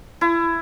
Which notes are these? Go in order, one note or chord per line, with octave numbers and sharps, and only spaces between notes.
E4